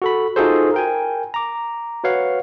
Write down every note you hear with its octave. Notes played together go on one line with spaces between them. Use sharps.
F#4 A4 B5
D#4 F4 F#4 G#4 A4 C5
A#4 G5 G#5
A#5 D6
F#4 B4 C#5 F5 F#5